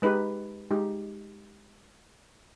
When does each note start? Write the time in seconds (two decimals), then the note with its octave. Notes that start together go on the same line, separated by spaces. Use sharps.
0.02 G#3 D#4 G4 B4
0.71 G#3 D#4 G4